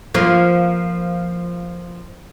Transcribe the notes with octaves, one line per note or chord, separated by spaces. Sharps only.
F3 A#3 F4